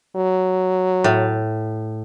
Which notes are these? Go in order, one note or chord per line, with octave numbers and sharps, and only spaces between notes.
F#3
A2